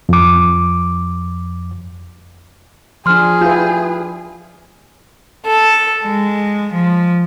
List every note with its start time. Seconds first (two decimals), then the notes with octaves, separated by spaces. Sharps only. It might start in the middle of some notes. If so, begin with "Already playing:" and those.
0.09 F2 D6
3.06 F3 D4 G#4 C6 F6
3.41 E4 F4 G4 B4 G6
5.47 A4
6.03 G#3
6.73 F3